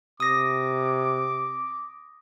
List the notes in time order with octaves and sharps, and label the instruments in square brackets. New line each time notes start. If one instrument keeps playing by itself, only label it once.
[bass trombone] C3 [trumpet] D6 [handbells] D#6 A#6